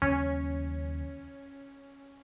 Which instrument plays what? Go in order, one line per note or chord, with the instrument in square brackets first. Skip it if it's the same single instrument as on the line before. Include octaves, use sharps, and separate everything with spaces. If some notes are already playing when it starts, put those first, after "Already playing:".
[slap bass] D#2 C#3 F#3 [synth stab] C#4